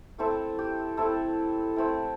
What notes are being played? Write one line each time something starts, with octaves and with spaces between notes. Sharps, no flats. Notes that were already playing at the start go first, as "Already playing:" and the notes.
A3 C4 E4 A4
G4
A3 C4 E4 A4
A3 C4 E4